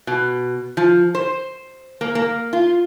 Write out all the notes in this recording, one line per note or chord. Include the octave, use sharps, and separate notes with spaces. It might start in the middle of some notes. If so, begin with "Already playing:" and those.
B2
F3
C5
A#3
A#3
F4